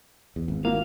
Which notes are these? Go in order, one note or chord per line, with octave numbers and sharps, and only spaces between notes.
E2
G#1
A#3 E4 F#4 F5